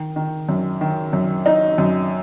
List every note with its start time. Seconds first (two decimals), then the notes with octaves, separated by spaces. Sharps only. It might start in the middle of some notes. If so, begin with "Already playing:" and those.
Already playing: D#3
0.16 D#3
0.49 F#2
0.81 D#3
1.13 F#2
1.46 D#4
1.78 F#2